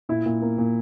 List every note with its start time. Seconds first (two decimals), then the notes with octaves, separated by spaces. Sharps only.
0.09 A#2 E4
0.26 A#2
0.42 A#3
0.58 A#2